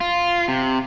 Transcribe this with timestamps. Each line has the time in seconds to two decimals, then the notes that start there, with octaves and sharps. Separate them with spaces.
0.01 F4
0.48 C3